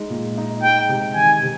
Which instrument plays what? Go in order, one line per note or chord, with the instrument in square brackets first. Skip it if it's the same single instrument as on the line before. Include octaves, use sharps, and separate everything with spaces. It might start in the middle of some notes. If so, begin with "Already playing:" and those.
Already playing: [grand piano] G#3 D#4
A#2
D#4
[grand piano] G#3 [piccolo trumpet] G5
[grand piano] C3
[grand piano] D#3 [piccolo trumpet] G#5
[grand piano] C3